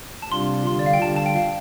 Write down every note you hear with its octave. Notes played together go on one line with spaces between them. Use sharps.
A5
C3 G3 D4 F4 C6
D3 G3 F4 C6
D5
F5
G5
D3 G3 F4 A5
A5
G5
F5